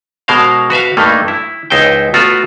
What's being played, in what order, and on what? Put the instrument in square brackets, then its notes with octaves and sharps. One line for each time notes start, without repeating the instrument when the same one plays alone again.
[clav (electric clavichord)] B2 G#3 A#4 C5 F5
F#4 B4 E5 F5
G2 A3 A#3 D#4
E4
C#2 D#4 E4 C5 G5
A3 B3 F4 F#4